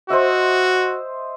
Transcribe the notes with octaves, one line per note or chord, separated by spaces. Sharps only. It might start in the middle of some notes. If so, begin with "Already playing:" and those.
F#4 C5 D#5 E5